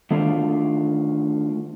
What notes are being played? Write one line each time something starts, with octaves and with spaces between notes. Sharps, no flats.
D#3 A3 D4 F4